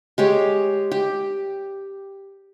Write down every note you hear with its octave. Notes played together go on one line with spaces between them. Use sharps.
G#3 G4 C#5
G4